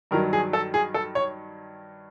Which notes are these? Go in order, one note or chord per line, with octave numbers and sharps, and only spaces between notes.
G2 D#3 F#3 A#4
G#4
A4
G#4
A4
C#5